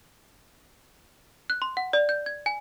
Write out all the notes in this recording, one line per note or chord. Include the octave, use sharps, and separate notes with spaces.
F#6
C6
F#5
D5
G6
G#6
G#5